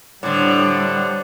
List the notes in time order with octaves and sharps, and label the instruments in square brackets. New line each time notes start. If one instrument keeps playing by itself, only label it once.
[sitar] A2 D3 [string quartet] G3 [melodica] C5 D5 F#5